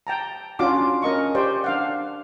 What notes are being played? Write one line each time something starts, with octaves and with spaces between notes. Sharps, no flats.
G5 A5 A#5
C#4 D4 F4 F#4 A5 D6
C#4 A#4 D#5 C#6
G4 C5 D5 G5
D4 F5 F#5